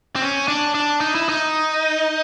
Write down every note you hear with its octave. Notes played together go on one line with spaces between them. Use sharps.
C4
C#4
D4
D4
D#4
E4
D#4